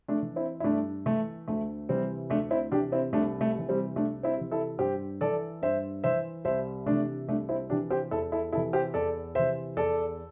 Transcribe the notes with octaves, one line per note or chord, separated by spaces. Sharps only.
A3 D4
E3
C4 E4
E4
G2 A3 D4
E3 A3
D2 A3
C3 E3 G3 C4
D2 A3 D4
C4 E4
C3 E3 D4 G4
C4 E4
C2 A3 D4
A3
C3 E3
G3 C4
C2 A3 D4
C4 E4
C3 E3
E4 A4
G2 G4 C5
E3 A4 D5
G2 C5 E5
E3 C5 E5
C2 C5 E5
C3 E3 A3 D4
C2 A3 D4
C4 E4
C3 E3 D4 G4
G4 C5
E2 E4 A4
E4 A4
C3 E3 E4 A4
G4 C5
E2 A4 D5
C3 E3 C5 E5
E2 A4 D5